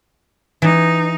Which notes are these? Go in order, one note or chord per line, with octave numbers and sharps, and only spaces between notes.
E3 D#4